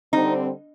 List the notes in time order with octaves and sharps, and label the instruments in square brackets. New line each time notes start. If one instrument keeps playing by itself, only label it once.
[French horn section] D3 G3 C4 [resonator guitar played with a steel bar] D#4